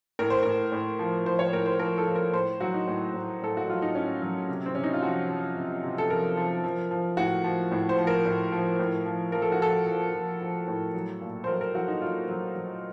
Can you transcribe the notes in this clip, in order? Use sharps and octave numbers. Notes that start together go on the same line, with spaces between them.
A2 A#4
C5
A2 A#4
A2
F3
F3 C5
C#5
A2 A#4
C5
F3 A#4
A4
F3
A#4
A2 C5
F#3 F#4
D#4
A2
A2
A2 A4
F#4
F#3 F4
D#4
A2 C#4
F#3
C3
C4
C3 C#4
D#4
F4
F3 F#4
F3
C3
C3
A4
F3 A#4
F3
F3
F3
A2 F#4
F3
A2
C5
F3
A#4
A2
F3
A2
F3
F3 A#4
A4
F#4
F3 A4
F3
F3
F3
A2
F#3
A#2
C5
F#3 A#4
A#4
F#3 F#4
D#4
F#3 F4
F#3
F#3